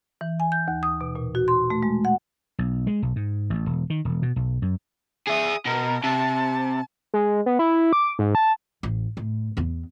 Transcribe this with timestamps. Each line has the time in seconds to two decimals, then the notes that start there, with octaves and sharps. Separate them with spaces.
0.21 E3
0.40 G#5
0.52 G6
0.68 D#2
0.83 D#6
1.01 B2
1.16 A#2
1.35 F#4
1.48 C6
1.70 A3
1.83 G#3
2.05 F#5
2.59 B1
2.87 G#3
3.02 B1
3.16 G#2
3.50 A1
3.66 E1
3.90 D#3
4.05 E1
4.23 B2
4.36 B1
4.62 F#2
5.28 G#4 E5 D#6
5.66 B2 A#4
6.04 C3 A5
7.14 G#3
7.46 B3
7.59 E4
7.93 D6
8.19 G#2
8.35 A5
8.83 A1
9.17 A2
9.57 E2 B3